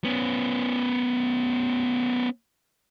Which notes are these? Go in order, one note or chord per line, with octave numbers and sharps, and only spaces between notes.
B3 C#4